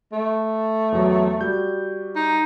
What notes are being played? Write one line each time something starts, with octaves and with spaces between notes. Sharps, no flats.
A3
E2 F#3
G3 F#4 G6
D#4